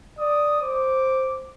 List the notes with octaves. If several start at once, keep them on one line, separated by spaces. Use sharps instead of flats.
D5 D#6
C5 D6